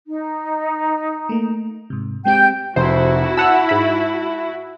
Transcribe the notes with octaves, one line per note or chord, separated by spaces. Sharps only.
D#4
A3 A#3
G#2 C3
G#3 C4 G4 G5 G6
F1 E4 F#4 C5
F#5 A5 E6 E7
G#2 B5